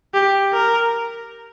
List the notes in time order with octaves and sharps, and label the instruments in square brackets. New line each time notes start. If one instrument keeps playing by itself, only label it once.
[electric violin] G4
A#4